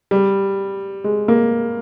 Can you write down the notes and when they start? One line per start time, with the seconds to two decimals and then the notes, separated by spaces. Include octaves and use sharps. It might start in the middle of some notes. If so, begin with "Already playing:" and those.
0.11 G3
1.04 G#3
1.28 A#3